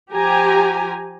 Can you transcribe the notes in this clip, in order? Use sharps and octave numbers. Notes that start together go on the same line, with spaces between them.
F3 G4 G#5 A#5